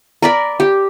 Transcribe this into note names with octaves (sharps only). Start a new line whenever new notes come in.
A#4 D5 B5
G4